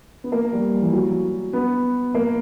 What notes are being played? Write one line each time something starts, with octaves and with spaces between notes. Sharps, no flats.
B3
A#3
G3
E3
F#3
B3
A#3